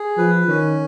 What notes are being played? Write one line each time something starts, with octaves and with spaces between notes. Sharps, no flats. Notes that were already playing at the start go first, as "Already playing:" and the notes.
Already playing: G#4
F3 B4
D#3 C#4